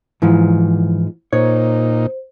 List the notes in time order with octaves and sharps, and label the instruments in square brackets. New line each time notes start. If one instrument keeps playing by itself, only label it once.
[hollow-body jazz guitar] G#2 E3 F3 [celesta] E4
[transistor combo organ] A#2 D#4 [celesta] C5 [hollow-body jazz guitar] C#5